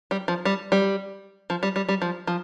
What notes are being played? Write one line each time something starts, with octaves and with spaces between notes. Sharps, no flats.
G3
F3
G3
G3
F3
G3
G3
G3
F3
F3